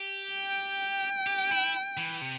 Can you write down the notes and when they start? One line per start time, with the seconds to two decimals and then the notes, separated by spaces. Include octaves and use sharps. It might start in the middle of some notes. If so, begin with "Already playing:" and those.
Already playing: G4
0.33 G5
1.27 G4
1.51 E4
1.97 E3
2.21 C3